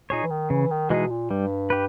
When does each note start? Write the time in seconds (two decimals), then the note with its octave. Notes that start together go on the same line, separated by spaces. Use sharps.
0.10 A#2 D#4 G#4 C#5
0.23 E3
0.31 D#3
0.50 C#3 E3
0.71 D#3
0.90 B2 E3 G#3 D#4 G#4
1.10 A#2
1.30 G2 G3
1.70 G4 B4